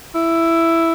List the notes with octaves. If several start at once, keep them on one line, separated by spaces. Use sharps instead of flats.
E4